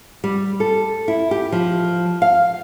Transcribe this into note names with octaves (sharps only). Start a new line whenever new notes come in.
G3
A4
E4
G4
F3
F5